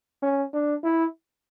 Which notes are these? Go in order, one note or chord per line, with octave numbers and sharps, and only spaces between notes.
C#4
D4
E4